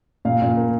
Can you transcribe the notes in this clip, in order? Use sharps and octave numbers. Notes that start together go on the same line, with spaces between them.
A#2 F5
A#2
A#3